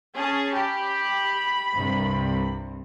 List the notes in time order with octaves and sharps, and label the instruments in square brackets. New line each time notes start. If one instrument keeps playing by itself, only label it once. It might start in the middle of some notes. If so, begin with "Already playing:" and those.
[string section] C#4 G#4 A5
[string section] G4 [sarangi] B5
[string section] C2 G2 C3